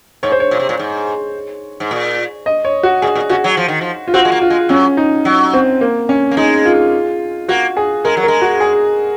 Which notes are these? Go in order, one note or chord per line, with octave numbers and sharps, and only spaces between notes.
G#2 C#5
C5
C#5
A#2
C3
A#2
G#2
G#2
A#2
D#5
C#5
F#4
A#2 G#4
A#2
C#3 F#4
F#3
F3
D#3
F3
F4
C4 F#4
G#3
A#3
F4
G#3
F#3 C#4
D#4
F#3
C4
A#3
C#4
A#3
G#3 D#4
F4
A#3 F#4
G#4
G#3 A#4
F#3
G#3 A#4
F#4
G#4